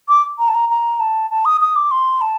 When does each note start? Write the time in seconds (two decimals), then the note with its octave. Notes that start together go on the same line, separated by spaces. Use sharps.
0.09 D6
0.39 A#5
0.48 A5
0.54 A#5
0.69 A#5
1.00 A5
1.31 A5
1.45 D#6
1.61 D#6
1.76 D6
1.91 C6
2.21 A5